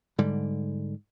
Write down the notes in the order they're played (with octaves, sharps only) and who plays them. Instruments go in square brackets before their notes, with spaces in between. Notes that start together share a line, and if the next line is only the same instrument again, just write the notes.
[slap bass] G#2 D3 G3